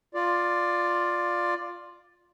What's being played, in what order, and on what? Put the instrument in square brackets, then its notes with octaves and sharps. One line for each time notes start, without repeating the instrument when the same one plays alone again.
[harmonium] F4 D5